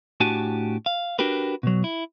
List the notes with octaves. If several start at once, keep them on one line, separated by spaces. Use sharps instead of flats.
A2 D4 F#4 G4 G#5 A5
F5
D4 F#4 G4 A#4 B4
B2 F#3
E4